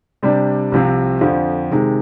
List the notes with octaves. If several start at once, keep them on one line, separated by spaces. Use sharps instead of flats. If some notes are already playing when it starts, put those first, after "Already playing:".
C3 G3 D4
C2 C3 F3 C4
F2 D3 F3
C3 D#3 G#3